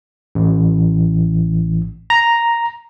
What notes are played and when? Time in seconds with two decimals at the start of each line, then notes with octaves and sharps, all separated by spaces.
0.35 A1
2.10 A#5